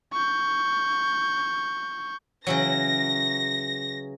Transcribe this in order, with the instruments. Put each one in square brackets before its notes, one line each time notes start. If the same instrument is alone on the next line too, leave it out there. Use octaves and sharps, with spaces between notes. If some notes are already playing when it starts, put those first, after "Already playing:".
[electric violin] C#6 G6
[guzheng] C#3 E3 F#3 [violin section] A#6